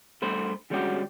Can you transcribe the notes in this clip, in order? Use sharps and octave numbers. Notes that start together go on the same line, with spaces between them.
G2 A3 C5 B5
D3 G3 G#3 C#4 F#4 G4